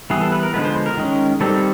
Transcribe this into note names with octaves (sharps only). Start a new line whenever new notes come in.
E3 G3 B3 G#4
A4
B4
A#4
D3 F3 G#3 B3 B4
C5
A#4
D#3 G#3 C#4
D#3 G3 C4 A4